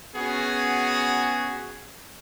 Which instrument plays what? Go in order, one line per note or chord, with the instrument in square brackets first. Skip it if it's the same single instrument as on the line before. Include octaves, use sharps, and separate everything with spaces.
[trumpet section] B3 C#4 F#4 G#4